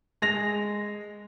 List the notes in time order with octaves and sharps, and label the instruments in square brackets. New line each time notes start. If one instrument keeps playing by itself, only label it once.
[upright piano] G#3 A#6 F7